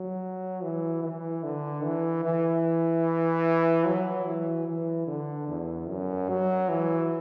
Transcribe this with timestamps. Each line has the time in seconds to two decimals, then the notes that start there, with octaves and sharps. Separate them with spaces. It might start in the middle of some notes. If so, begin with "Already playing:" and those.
Already playing: F#3
0.63 E3
1.03 E3
1.43 D3
1.84 E3
2.24 E3
3.86 F#3
4.26 E3
4.68 E3
5.07 D3
5.48 E2
5.89 F#2
6.29 F#3
6.69 E3